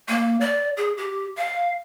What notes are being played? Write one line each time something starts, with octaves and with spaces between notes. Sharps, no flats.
A#3
D5
G#4
G4
F5